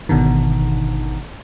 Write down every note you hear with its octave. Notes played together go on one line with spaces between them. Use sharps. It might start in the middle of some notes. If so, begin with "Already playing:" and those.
G#1 B2 D3 D#3